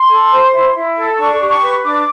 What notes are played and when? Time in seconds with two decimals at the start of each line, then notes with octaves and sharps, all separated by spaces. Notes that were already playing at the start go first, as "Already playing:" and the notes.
Already playing: C6
0.09 A4
0.31 C5
0.53 E4
0.74 E4
0.96 A4
1.18 D4 C#6
1.39 G4
1.50 C#6
1.60 B4
1.82 D4 D6